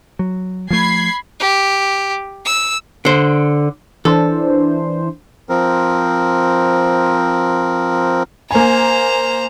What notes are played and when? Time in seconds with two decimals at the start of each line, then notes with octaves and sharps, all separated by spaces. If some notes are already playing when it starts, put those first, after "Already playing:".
0.19 F#3
0.71 F3 A3 B5 G#6 C7
1.40 G4
2.45 E6
3.05 D3 C5
4.05 E3 D4 A4 C5
5.49 F3 C4 A#4
8.51 A#3 C5 G#5 A#5